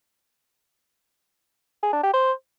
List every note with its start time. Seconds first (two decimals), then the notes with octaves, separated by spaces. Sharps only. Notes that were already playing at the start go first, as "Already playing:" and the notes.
1.83 G#4
1.93 D4
2.03 G4
2.14 C5